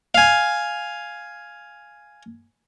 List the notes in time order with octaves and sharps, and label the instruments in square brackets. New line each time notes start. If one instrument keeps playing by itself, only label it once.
[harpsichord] F5 G#5